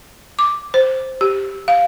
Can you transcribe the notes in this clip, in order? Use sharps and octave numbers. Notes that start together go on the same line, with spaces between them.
D6
C5
G4
F5